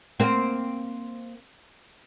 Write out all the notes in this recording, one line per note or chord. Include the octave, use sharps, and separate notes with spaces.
A#3 C4